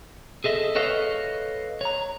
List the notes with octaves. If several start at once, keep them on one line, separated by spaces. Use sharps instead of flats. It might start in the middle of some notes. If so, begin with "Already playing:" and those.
G#4 A4 D#5 E5
A4 B4 C#5 D#5 F5
C#5 A#5